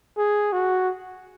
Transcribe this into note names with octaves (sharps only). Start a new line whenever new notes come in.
G#4
F#4